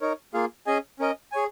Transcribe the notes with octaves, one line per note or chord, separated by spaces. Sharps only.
D#4 A#4 C#5
A#3 F4 G#4 F5
C#4 G#4 D#5 G#5
C#4 A#4 D#5
G#4 C#5 G#5